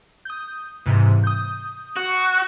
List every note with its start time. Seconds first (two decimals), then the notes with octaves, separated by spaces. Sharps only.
0.25 D#6 G6
0.86 G#2 C3 E3
1.24 D#6 G6
1.96 F#4